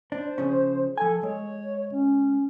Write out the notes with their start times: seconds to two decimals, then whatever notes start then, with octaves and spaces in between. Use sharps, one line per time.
0.12 D4 C5
0.38 C#3 F3 C#4
0.98 F3 A4 G#5
1.23 G#3 C#5
1.92 C#4